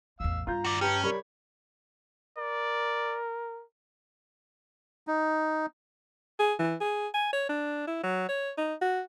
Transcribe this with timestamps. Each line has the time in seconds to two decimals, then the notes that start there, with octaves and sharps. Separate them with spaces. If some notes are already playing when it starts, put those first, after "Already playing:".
0.20 A1 E2 F5 E6
0.47 G2 F4 A#5 G6
0.65 F#4 D5
0.81 C#4 G4 B4 G5 A5 A#5
1.04 G3 A#4 C#5 B5
2.38 A#4 D5
5.07 D#4
6.40 G#4
6.59 E3
6.81 G#4
7.14 G#5
7.33 C#5
7.49 D4
7.88 E4
8.04 F#3
8.29 C#5
8.58 D#4
8.82 F#4